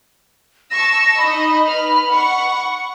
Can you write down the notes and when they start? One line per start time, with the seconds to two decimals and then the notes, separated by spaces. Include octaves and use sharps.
0.71 A5 C#6 E6 A#6
1.18 D#4 D#5 B5
1.67 B4 F6
2.10 F#5 C#6